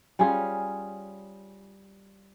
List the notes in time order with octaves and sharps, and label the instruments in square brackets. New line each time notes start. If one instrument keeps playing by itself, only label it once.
[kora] G3 C#4 F4 G#4